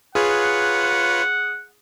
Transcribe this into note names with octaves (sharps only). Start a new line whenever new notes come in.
F4 G#4 B4 C#5 F#5